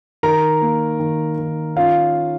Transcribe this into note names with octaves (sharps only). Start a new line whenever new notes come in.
D#3 A#4 A#5
A#3
D#3
D#3
C#4 F4 F5